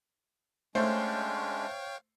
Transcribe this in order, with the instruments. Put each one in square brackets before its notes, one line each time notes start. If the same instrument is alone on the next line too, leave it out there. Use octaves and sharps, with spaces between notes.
[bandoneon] G#3 C#4 D4 [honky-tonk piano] A3 [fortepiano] C5 [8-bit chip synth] C#5 F5 G5